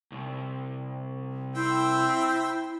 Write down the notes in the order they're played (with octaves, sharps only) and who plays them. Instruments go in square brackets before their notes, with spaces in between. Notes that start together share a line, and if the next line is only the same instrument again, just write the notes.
[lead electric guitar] C2
[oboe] C4 [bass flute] E4 [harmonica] C5 E5 G5